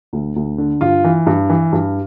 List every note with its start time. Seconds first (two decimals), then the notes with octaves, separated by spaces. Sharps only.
0.13 D2
0.36 D2
0.58 D3
0.81 G2 F4
1.04 E3
1.26 G2
1.49 E3
1.73 G2